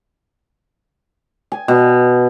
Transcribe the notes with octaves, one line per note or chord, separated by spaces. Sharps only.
G#5
B2